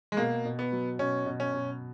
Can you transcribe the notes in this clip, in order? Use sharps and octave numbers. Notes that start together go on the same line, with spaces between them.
G#3
B2 A#3
B2
B3
F#3
B2 C#4
B2
C#4
B2